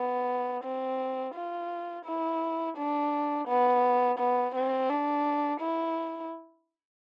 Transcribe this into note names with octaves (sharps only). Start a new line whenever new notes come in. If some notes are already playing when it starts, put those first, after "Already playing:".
Already playing: B3
C4
F4
E4
D4
B3
B3
C4
D4
E4